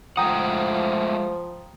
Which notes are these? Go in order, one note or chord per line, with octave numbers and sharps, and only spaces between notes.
F3 G#3 A3 F#5 G5 A#5 D#6